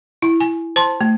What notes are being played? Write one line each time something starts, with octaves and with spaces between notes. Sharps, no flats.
E4
G#5
C5 A5 C6
A3